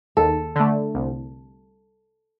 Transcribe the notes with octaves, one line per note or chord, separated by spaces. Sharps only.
D#2 A4
D3 A3
C2